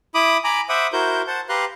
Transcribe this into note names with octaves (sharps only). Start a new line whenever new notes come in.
E4 B5 D6 D#6
G#5 A#5 B5 D6
C5 E5 F#5 B5 D6 D#6
E4 F#4 A#4 C5 G6
C5 F#5 A5
G4 B4 F5 A#5 C6 F#6